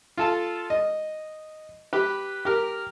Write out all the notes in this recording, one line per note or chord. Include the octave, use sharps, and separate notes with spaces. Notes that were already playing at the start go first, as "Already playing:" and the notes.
F4 A4 A5
D#5
G4 B4
G4 A#4